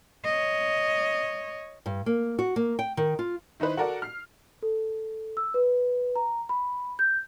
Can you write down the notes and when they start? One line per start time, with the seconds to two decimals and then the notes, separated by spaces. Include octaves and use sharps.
0.25 C#5 D#5
1.86 G2
2.06 A#3
2.39 F#4
2.56 A#3
2.79 G5
2.97 D#3
3.19 F4
3.60 D#3 D#4 E4 B4 C5
3.77 F#4 A4 A#4 D5 F#5
4.02 F6 C7
4.63 A4
5.37 E6
5.54 B4
6.16 A#5
6.49 B5
6.99 G6